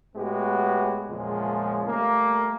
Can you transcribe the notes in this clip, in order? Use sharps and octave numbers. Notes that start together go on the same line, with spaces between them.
A2 G#3 B3 F#4 G4
E2 A#2 C#3 F3 G#3
G3 A3 A#3